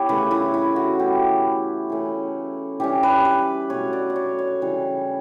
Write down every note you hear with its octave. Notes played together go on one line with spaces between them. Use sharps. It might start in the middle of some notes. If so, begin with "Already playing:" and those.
Already playing: B3 E4 G4 C#5
C#3 E3 A3 B4
E4
E4
F#4
E3 A3 C#4 G4
E3 A3 C#4
E3 G3 C#4 G4
B4
B4
B2 F#3 A3 C#4 C#5
D5
D5
C#5
C#5
C#3 E3 G3